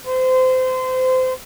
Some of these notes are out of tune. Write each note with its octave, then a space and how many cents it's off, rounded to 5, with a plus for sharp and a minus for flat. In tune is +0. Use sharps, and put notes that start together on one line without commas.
C5 -25